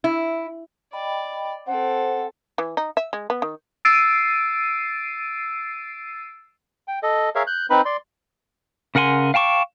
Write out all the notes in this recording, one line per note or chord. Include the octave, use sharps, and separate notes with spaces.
E4
D5 D#5 G5 B5
C4 A4 C5 F#5
E3
D#4
E5
G#3
B3
D#3
E6 A6 C7 D7 D#7
G5
A4 D#5
G#4 A#4 C#5 E5 F5
F#6 G6
C4 D#4 B4 B5
D5 C6
C#3 A#4 F#5 G#5 C6
F5 G5 A5 C#6 D6